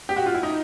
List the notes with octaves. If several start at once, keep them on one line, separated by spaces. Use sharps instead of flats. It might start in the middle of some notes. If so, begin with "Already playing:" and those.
G4
F#4
F4
E4
D#4